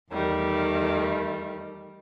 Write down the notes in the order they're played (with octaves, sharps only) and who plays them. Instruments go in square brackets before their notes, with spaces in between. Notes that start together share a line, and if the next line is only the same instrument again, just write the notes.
[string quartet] E2 D#3 G3 A3